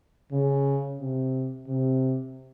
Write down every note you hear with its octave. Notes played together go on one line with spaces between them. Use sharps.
C#3
C3
C3